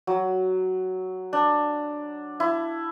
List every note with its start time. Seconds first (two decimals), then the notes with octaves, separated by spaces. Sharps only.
0.07 F#3
1.33 D4
2.40 E4